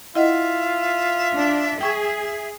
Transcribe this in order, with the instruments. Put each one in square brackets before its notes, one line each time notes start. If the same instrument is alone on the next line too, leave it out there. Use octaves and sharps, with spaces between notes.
[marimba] E4 D#5 F#5 [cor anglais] F4 [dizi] E5
[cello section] D4
[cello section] G#4 [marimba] G5 C#6 G#6